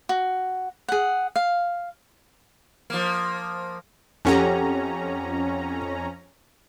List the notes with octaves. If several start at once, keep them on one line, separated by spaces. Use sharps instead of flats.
F#4
G#4 F#5
F5
F3 A#3
F2 C#4 G4 A4 F#5 A#5